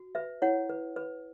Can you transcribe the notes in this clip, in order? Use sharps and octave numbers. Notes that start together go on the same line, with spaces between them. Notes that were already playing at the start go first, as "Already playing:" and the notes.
Already playing: F#4
B4 E5
E4 C#5 F#5
B4
B4